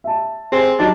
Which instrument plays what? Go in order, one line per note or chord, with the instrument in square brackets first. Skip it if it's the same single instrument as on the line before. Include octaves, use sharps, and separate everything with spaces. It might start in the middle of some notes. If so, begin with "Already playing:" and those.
[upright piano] E5 A5
[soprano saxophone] C4 [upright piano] G#4
[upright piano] F#3 D#4 G4 [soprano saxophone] D4